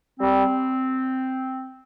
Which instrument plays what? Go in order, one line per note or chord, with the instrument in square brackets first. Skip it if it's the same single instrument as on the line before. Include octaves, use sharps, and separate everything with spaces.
[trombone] G3 [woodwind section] C4